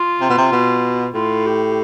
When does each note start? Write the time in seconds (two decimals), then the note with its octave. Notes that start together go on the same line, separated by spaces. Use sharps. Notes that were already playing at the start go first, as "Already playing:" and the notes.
Already playing: F4
0.21 C3
0.29 B2
0.38 C3
0.52 B2
1.14 A2 F4
1.45 G4